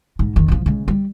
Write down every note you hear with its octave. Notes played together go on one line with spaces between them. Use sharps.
G#2
F1 D#3
C3 F3
C#3 G#3
G3